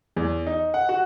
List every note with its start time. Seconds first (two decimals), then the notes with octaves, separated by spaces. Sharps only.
0.16 E2
0.47 D#4
0.74 F#5
0.89 F#4